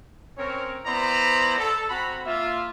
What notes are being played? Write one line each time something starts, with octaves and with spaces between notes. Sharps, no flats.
C4 C#4 A#4 C#5
B3 E4 C5 D5 A#5 B5
A4
C4 F#4 A#5 B5
A#3 F4 E5